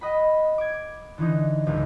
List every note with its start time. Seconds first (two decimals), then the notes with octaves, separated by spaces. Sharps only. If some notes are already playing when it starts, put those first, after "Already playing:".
0.01 D#5 F#5 B5
0.58 D6 G#6
1.18 D3 E3 D#4
1.67 G#1 C#2